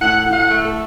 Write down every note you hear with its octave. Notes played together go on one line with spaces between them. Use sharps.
A2 F#5
A2
F#5
A3
A4